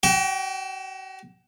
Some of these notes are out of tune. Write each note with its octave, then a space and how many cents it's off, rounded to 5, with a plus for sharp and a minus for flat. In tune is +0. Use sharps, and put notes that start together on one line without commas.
F#4 +40 G5 +0